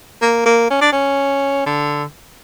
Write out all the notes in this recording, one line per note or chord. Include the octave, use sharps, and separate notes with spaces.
A#3
A#3
C#4
D4
C#4
D3